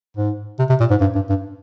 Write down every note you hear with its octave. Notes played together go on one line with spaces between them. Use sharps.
G#2
C3
C3
A#2
G#2
G2
G2
G2